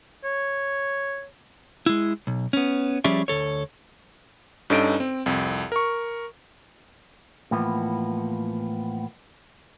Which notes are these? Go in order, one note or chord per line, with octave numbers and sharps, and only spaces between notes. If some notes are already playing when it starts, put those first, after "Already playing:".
C#5
G#3 E4
B1
B3 C#4
F3 G3 C#4 G#4 D5 E5
D2 A4 C#5
G2 C#4 D#4 A4 D#5 D7
C4
C2 F2
A#4 C#6
A2 E3 F3 A#3 B3